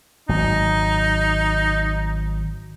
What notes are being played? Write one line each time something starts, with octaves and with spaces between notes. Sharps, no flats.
G#1 F#3 D#4